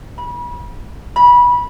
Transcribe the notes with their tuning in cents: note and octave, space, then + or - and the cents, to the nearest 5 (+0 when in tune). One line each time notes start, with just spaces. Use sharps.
B5 -35
B5 -20